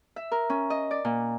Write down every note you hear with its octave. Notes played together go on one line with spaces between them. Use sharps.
E5
A#4
C#4
D#5
D5
A#2